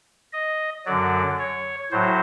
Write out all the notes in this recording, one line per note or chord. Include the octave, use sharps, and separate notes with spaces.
D#5
F#2 D3 F#3 D5
C#5
A2 F#3 C5